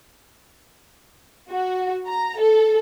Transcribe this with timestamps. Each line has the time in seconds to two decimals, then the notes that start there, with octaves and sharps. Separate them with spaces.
1.49 F#4
2.07 A#5
2.40 A4